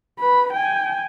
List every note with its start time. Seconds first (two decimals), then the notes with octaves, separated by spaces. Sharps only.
0.19 B4 B5
0.53 G5 G#5